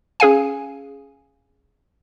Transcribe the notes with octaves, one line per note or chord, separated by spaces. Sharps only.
C#4 G#4 F5 G#5